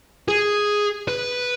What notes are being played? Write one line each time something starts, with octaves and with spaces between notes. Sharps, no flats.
G#4
B4